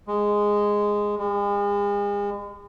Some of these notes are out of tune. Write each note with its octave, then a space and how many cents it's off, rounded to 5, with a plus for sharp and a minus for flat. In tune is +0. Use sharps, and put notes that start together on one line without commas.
G#3 -5
G#3 -40